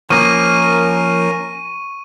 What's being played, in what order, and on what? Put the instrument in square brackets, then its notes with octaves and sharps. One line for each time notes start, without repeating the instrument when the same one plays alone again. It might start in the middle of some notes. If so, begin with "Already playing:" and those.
[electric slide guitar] F3 A#3 [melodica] C#4 A#4 [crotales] C#6 D#7